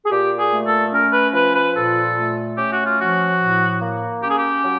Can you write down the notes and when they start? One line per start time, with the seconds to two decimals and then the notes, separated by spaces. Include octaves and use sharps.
0.05 G#4
0.11 A#2 G4
0.38 G#4
0.52 A3
0.66 A4
0.92 C#4 A#4
1.13 B4
1.34 F3 B4
1.54 B4
1.74 A#2 A4
2.16 A3
2.57 C#4 G4
2.71 F#4
2.84 F4
2.98 F3 F#4
3.40 A2
3.80 A#3
4.22 C#4 G4
4.30 G#4
4.37 G4
4.63 F#3